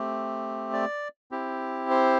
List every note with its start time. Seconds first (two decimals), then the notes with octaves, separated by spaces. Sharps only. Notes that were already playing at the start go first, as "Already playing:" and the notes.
Already playing: A3 C4 G4
0.73 D5
1.31 C4 E4 G4
1.90 C5